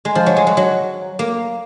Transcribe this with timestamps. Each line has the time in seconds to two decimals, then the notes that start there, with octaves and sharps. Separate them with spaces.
0.05 G#3
0.15 F3
0.26 F#3
0.37 G#3
0.47 F#3
0.57 F#3
1.19 A#3